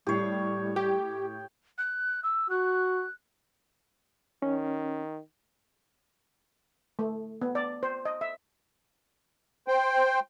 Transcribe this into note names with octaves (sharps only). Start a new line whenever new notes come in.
A2 G3 E4 G4 C#5 C7
G4 G5
F#6
E6
F#4 F#6
D#3 C#4
A3
B3
D5
C5
D#5
E5
C5 G5